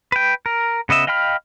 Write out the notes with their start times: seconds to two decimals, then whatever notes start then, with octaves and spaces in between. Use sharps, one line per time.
0.12 B4 G5
0.46 A#4
0.89 C#3 B3 D#5 E5
1.07 D#5 F5 G5 B5 F6